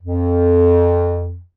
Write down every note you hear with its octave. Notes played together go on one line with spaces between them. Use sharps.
F2